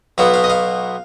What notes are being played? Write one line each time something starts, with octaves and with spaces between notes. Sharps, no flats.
B1 B2 B3 F5
F5
D#5
F5